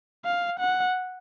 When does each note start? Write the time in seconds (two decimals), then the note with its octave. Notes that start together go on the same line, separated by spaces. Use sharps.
0.25 F5
0.59 F#5